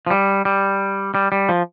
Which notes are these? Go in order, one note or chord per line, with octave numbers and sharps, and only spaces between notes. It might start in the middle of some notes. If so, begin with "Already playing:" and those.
F3
G3
G3
G3
G3
F3